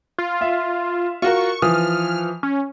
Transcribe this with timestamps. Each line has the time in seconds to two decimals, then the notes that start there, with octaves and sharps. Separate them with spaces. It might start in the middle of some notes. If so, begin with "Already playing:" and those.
0.18 F4
0.41 E5 F5
1.22 F4 F#4 A#4 C#6
1.62 E3 F3 D#6 F6
2.43 C#4